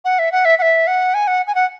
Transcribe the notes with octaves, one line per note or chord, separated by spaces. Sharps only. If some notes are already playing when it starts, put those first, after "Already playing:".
F#5
E5
F#5
E5
F#5
E5
F#5
G#5
F#5
G#5
F#5